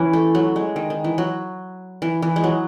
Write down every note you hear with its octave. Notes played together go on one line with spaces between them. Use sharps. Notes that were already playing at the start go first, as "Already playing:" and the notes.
Already playing: E3 C#4 E4
A3
F#3
G#3
D#3
D#3
E3
F#3
E3
E3
G#3
F#3